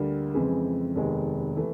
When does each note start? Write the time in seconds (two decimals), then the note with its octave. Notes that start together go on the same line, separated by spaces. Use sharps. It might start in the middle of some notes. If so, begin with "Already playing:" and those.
Already playing: D2 D3 G3 A#3
0.34 F2 C#3 E3 G#3 C4
0.95 F1 D#2 D#3 G#3 B3
1.56 E3 A3